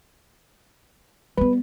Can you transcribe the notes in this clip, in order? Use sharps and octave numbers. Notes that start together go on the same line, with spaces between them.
G3 B3 B4